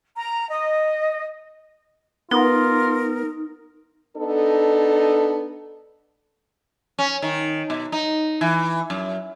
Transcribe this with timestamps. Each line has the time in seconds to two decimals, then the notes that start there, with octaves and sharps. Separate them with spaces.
0.16 A#5
0.50 D#5
2.31 B3 D#4 F4 A#4
4.16 B3 D4 D#4 A4
6.99 C#4
7.22 D#3
7.70 B2
7.92 D#4
8.41 E3
8.90 F#2